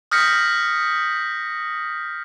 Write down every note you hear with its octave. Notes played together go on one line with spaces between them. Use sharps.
D#6 F6 G6 A#6 B6 C#7